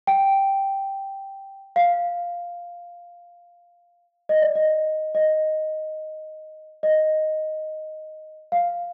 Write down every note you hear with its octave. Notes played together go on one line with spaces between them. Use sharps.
G5
F5
D#5
D5
D#5
D#5
D#5
F5